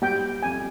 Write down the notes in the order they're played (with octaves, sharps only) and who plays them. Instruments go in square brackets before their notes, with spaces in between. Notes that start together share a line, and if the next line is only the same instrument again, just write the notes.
[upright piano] G3 [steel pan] G5
[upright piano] F2 [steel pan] G#5